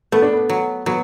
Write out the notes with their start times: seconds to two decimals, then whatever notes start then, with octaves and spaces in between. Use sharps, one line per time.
0.12 A3 B3
0.22 D4
0.33 B3
0.49 F#3
0.86 F#3 B3